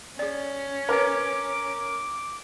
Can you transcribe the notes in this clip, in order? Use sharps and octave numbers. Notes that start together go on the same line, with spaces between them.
C#4 G#4 D5
A#4 B4 C#5 D6